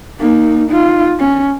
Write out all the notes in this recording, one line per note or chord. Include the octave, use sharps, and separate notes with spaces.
A#3 D#4
D#4 F4
C#4